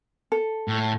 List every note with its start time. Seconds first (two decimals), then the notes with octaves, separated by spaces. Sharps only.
0.32 A4
0.68 A2